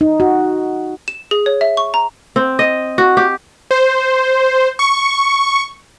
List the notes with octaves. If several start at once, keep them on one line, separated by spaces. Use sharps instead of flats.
D#4
F#4
E7
G#4
C#5
E5
C#6
A#5
C4
D#5
F#4
G4
C5
C#6